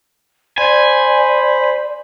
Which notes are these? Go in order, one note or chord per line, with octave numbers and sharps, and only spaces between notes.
C5 D5 G#5 B5